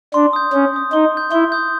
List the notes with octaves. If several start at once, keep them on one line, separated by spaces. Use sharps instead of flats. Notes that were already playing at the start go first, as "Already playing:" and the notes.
D4 C6
D#6 G6
C#4 C6
D#6 G6
D#4 C6
D#6
G6
E4 C6
D#6 G6